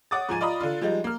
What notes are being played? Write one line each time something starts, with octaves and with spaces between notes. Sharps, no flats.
C#5 F#5 D6 D#6 A6
G#2 F3 G#5 D#7
F4 D5 D#5 A#5 B5 D#6
D3 D4 F4
F3 G3 G#3 D#4
A#3 F6